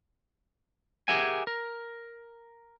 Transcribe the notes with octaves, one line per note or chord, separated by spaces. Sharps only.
G4 G#4 A#4 E5 F#5 G#5
A#4